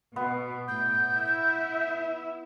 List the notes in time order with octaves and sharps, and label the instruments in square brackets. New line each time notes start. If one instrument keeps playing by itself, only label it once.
[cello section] B2 [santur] B3
[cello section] A2 [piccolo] G6
[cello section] E4 E5